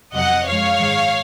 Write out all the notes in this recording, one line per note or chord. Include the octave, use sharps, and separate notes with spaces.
F2 C3 F#3 D#5 F#5
F#2 F3 G#3 C#5 F5
G#2 D#3 G#3